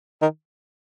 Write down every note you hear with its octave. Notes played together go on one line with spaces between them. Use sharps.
D#3